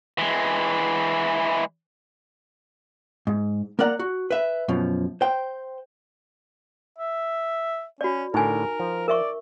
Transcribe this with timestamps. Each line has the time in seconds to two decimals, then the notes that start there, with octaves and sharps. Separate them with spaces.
0.19 E3 G#3
3.27 G#2
3.79 A#3 A#4 D5 F#5 A#5
3.99 F#4
4.31 B4 E5
4.68 F#2 B2 F3
5.21 C5 G5
6.98 E5
8.01 C#4 F#4 D5
8.34 A2 D3 D#4 A#4 G#5
8.80 F3
9.08 A#4 D5 E5 C#6